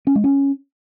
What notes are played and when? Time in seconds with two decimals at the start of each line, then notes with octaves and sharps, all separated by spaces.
0.07 C#4
0.15 G#3
0.24 C#4